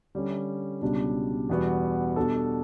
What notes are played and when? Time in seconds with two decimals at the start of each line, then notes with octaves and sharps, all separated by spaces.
0.15 D3 G3 C#4
0.82 C#2 B2 G3 D4
1.49 E2 B2 G3 B3 F#4
2.16 B2 G3 D4 A4